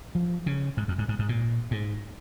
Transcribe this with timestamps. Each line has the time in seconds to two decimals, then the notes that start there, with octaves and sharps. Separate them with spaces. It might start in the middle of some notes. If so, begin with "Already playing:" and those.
0.15 F3
0.46 C#3
0.77 G#2
0.88 F2
0.98 G#2
1.09 G#2
1.19 G#2
1.29 A#2
1.71 G#2